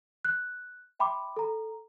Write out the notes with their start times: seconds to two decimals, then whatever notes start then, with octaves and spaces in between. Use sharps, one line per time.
0.25 F#6
0.99 E5 G5 B5 C6 D6
1.36 A4 A#5